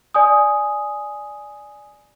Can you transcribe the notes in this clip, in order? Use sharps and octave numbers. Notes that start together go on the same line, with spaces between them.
D5 G#5 D#6